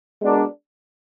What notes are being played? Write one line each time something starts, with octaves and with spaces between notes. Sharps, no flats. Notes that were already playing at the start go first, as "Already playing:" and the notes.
G#3 B3 D4 F#4 A#4